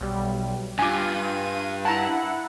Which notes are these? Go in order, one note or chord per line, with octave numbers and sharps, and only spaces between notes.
B1 G3
G2 F4 G#5 D6 D#7
E4 F#5 A5 A#5